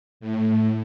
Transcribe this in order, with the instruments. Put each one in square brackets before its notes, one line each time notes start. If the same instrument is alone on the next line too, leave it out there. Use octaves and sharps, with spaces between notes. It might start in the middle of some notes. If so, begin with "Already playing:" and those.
[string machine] A2